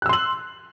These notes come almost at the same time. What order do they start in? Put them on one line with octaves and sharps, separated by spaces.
F#6 E6 C6 F#7